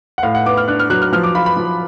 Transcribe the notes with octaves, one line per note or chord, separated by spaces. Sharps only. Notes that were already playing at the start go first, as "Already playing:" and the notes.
F#5
A2 F5
F#5
B3 D6
F6
D4 F#6
F6
F#3 F#6
F6
F3 F6
D6
F4 B5
B5
F3